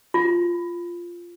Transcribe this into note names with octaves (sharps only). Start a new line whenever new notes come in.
F4